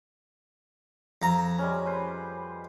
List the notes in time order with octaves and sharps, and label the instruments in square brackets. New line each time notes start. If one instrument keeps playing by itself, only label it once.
[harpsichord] F2 A#5
[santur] G3 G#3 C#4
B4 C5